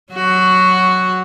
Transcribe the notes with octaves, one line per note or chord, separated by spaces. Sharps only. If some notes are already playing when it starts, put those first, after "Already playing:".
F#3 F#4